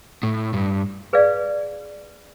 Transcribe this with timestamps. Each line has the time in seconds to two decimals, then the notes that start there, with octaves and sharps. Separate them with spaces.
0.23 A2
0.54 G2
1.13 G#4 B4 D5 F5